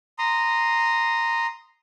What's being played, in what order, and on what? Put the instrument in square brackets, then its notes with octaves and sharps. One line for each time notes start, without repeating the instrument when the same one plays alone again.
[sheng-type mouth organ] A#5 C6 D#6